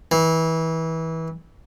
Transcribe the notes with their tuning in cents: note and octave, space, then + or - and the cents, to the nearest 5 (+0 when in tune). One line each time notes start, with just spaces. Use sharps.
E3 -25